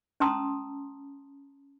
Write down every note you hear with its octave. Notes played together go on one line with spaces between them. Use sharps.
C#4 A5 A#5 C6 D#6 E6